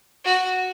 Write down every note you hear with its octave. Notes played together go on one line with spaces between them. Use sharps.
F#4